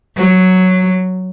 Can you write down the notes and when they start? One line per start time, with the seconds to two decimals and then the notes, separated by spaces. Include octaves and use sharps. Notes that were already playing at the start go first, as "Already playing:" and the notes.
0.17 F#3